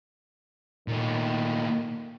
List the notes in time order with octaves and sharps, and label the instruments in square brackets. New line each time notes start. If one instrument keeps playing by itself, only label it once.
[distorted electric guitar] A#2 A3 [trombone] D#3